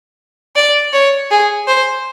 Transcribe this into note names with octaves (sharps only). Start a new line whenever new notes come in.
D5
C#5
G#4
C5